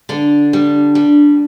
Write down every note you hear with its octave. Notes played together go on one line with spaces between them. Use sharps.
D3 D4
G3
G3